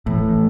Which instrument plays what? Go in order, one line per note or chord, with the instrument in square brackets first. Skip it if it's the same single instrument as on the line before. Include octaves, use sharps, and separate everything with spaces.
[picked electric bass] A2 [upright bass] E3